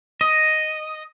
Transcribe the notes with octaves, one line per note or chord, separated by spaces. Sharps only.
D#5